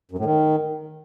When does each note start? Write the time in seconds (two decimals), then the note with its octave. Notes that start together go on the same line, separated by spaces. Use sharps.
0.11 F#2
0.18 A2
0.25 D#3